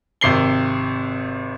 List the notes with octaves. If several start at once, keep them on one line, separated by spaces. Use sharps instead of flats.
G#1 C3 C7 G7